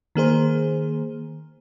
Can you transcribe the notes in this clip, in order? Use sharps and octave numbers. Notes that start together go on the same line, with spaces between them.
D#3 A#3 G#4 C5